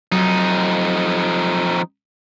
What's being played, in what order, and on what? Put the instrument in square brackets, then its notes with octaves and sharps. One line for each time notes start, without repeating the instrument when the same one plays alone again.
[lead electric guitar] F2 D#4 [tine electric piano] F#3